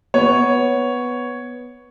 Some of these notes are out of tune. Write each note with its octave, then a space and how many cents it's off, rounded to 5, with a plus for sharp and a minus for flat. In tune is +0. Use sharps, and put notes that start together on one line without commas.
B3 +0 C#5 +0